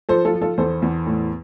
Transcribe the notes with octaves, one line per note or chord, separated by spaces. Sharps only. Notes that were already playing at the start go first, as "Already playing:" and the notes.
F3 A4 C5
F4 A4
F3
F4 A4
E2 A4 C5
E2
A2